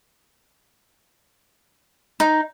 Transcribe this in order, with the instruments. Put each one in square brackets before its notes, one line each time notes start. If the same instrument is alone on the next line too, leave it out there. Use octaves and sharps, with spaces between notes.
[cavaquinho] D#4